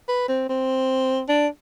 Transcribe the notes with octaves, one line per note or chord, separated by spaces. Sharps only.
B4
C4
C4
D4